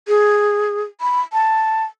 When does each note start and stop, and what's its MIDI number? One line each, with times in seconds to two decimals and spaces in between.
0.08 0.82 68
1.01 1.21 83
1.33 1.84 81